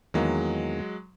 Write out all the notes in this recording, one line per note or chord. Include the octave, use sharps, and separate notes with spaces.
E2 D#3 F#3 G#3 A#3